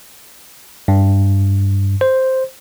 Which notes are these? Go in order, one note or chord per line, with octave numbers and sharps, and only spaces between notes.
G2
C5